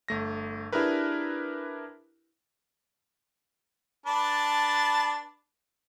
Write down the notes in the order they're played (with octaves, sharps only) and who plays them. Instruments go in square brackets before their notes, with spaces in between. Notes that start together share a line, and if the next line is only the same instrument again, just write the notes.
[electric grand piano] G1 A3 A#6
D4 E4 G4 G#4 A#4 B4
[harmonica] D4 B4 A5